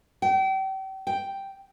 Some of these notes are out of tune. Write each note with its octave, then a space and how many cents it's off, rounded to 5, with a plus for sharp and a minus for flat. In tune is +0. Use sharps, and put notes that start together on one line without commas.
G5 -35
G5 -5